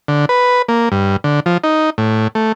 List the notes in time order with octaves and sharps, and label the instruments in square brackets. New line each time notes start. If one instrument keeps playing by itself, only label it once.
[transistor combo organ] D3
B4
A#3
G2
D3
F3
D#4
A2
A3